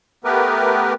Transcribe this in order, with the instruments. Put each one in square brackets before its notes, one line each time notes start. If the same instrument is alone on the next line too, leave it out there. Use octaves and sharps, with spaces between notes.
[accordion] A3 B3 G4 A#4 B4